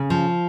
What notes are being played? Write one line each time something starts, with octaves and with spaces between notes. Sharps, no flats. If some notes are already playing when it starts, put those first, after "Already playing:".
Already playing: C#3
F3